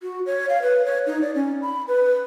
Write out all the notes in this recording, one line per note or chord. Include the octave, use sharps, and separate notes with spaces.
F#4
C#5
F5
B4
C#5
D#4
D5
C#4
B5
B4